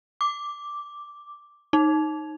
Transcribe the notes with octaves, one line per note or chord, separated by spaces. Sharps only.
D6
D#4